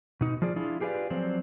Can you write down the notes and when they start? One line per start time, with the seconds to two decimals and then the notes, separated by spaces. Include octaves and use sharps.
0.21 B2 D#4
0.42 F3 F4 G#4 D5
0.56 D4 E4 F4 G#4
0.80 F4 G4 G#4 B4 D5 F5
1.10 F3 F#3 C4 C5 D5